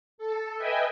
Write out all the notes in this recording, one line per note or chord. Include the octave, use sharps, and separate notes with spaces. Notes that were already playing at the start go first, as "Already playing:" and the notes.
A4
B4 D#5 E5 G5 G#5